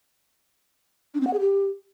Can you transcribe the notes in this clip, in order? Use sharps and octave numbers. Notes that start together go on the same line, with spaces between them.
D4
C4
F#5
G#4
G4